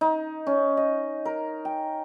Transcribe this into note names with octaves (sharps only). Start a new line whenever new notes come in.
D#4
C#4
D#5
A#4
G5